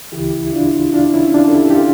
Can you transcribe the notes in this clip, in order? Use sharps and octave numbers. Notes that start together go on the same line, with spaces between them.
D2 C#3 E3 E4 G4
E4
D4 F4
E4
D4 F4
C#4 E4
D4 F4
A4
E4 G4
G4
F4 A4